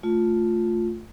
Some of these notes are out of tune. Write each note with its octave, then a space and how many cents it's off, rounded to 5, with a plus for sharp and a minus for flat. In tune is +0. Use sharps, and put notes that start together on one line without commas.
A3 +0 F4 +5